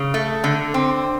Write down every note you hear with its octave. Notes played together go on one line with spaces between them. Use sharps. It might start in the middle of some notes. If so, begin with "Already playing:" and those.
Already playing: C#3
A3
D3
C4